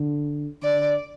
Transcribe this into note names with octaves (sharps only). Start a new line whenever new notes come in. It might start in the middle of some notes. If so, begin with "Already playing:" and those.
Already playing: D3
D3 D5